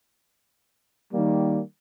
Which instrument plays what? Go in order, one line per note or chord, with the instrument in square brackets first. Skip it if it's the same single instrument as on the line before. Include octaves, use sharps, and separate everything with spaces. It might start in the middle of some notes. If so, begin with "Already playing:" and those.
[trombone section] D#3 G3 A#3